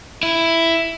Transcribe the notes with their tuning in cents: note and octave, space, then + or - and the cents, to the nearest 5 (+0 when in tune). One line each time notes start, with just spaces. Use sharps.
E4 +5